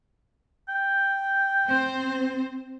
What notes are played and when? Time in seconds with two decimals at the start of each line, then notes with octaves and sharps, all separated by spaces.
0.69 G5
1.67 C4 C5